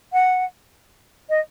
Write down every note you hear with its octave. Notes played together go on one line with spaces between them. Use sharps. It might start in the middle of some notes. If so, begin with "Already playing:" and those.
F#5
D#5